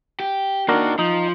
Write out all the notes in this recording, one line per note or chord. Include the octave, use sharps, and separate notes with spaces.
G4
A#3 D4 D#4 F#4 A#4
F3 D#4